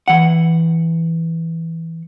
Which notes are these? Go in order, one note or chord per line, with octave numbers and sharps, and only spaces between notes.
E3 F#5